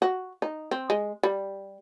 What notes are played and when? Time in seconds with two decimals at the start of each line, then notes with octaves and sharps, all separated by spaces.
0.02 F#4
0.42 D#4
0.71 C4
0.90 G#3
1.23 G3